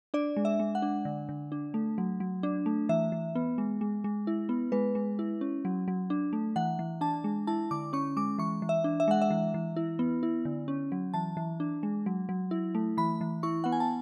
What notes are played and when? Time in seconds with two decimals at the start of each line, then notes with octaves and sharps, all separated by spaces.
0.14 D4 D5
0.37 G#3
0.45 E5
0.60 G#3
0.75 F#5
0.82 D4
1.05 D3
1.29 D3
1.52 D4
1.74 A3
1.98 F#3
2.20 F#3
2.43 D4
2.66 A3
2.89 E3 E5
3.12 E3
3.35 B3
3.58 G#3
3.81 G#3
4.04 G#3
4.27 E4
4.49 B3
4.72 G#3 B4
4.95 G#3
5.19 E4
5.41 C#4
5.65 F#3
5.88 F#3
6.10 D4
6.33 A3
6.56 E3 F#5
6.79 E3
7.01 D4 A5
7.24 G#3
7.47 E4 A5
7.71 D3 D6
7.93 C#4 C#6
8.17 G#3 D6
8.39 E3 C#6
8.62 E3
8.69 E5
8.84 D4
9.00 E5
9.08 G#3 F#5
9.22 E5
9.31 E3
9.54 E3
9.77 E4
9.99 B3
10.23 E4
10.45 D3
10.68 C#4
10.92 F#3
11.14 E3 A5
11.37 E3
11.60 D4
11.83 G#3
12.06 F#3
12.29 F#3
12.51 E4
12.75 A3
12.97 E3 B5
13.21 E3
13.43 E4 C#6
13.64 B3 F#5
13.72 G#5
13.80 A5